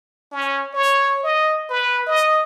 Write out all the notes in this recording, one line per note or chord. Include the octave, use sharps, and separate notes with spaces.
C#4
C#5
D#5
B4
D#5